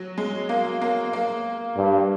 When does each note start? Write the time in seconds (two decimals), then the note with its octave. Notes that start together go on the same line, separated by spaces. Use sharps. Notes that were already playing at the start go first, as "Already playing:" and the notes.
Already playing: F#3
0.18 G#3
0.49 A#3
0.82 A#3
1.13 A#3
1.77 G2